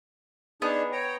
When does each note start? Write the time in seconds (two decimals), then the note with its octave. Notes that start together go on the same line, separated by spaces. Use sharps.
0.62 B3 D4 D#4 G#4
0.92 C#5 G5 A#5